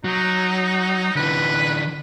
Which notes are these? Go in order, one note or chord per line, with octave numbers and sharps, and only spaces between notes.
F#3 D#4
D3 E3 B4